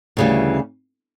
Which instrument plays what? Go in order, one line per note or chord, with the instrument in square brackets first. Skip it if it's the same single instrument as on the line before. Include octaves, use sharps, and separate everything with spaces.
[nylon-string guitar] D2 C#3 E3 G3